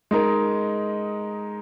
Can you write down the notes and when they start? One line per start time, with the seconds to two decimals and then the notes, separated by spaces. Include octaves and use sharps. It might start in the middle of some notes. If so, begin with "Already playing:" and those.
0.11 G#3 D#4 A#4